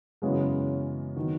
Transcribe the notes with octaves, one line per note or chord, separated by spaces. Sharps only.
F#2 C#3 E3 G#3 B3
D#3 F#3 B3